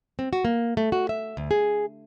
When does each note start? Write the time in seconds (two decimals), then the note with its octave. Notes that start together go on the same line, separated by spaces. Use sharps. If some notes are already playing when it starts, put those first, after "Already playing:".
0.19 C4
0.33 F#4
0.45 A#3
0.77 A3
0.92 F#4
1.09 E5
1.37 D2
1.51 G#4